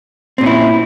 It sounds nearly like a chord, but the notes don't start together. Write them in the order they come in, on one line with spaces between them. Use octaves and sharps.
C4 A#2 C#4 E4